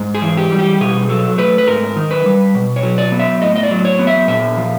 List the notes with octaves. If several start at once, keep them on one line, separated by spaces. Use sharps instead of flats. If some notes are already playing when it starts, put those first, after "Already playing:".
Already playing: G#2
G#4
E3
G4
G3
G4
B2 G#4
F#3 A4
A3 B4
B4
G#2 A#4
D#3
B4
G3
B2
C#5
F#3
D5
B3
E5
A2 D#5
D#5
D5
F#3
C#5
B3
E5
A#2 E5
F3